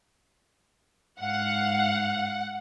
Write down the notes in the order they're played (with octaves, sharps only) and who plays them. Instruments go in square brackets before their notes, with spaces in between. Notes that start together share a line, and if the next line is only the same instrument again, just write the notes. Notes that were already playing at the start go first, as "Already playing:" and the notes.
[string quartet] G#2 F5 [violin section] F#5